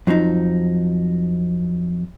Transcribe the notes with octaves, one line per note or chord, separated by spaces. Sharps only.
F2 F3 F#3 D#4